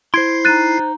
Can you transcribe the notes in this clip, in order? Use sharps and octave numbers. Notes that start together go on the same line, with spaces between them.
E4 C5 C6 G#6 C7 D7
D#4 F#6 A6 D#7